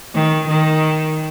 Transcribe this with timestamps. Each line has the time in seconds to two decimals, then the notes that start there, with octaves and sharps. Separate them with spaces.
0.15 D#3
0.48 D#3